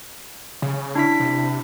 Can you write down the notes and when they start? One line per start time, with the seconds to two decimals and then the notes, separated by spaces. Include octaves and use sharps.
0.62 C#3
0.95 D4 E4 B6
1.20 C3